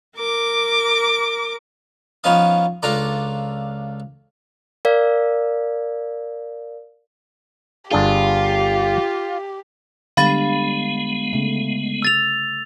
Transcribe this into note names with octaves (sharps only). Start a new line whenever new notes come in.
A#4 D6
F3 B3 C#4 D#4 F5 D#6
C#2 D4 F4 A4 A#5 D6
A#4 D5 F5
G1 D4 F4 G4 G#4
D3 G3 G#3 B3 F5 B5 A6
C#3 A3
E6 A6 F7